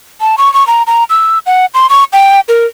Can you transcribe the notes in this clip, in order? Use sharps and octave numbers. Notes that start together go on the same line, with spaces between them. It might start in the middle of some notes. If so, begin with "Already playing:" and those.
A5
C#6
C#6
A#5
A#5
E6
F#5
C6
C#6
G5
A#4